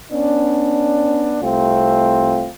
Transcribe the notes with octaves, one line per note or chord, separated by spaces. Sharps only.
B3 C#4 D4
C2 A3 C4 F4